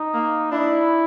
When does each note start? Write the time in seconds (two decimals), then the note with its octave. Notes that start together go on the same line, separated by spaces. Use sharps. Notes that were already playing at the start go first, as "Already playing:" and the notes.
Already playing: D#4
0.14 A#3
0.52 D4 E4